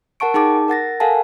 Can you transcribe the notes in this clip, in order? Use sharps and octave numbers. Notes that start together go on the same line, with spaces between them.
A#4 F#5 A5 C#6 D7
D#4 G#4 G5 A5 D6
A#4 F#5 A6 A#6
A4 A#4 F5 F#5 G#5 A5